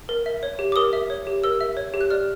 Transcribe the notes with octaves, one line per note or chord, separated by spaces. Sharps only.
A#4
E5
C#5
G4
D6
A#4 D#6
E5
C#5
G4
A#4 E6
E5
C#5
G4
F#6
D5 F6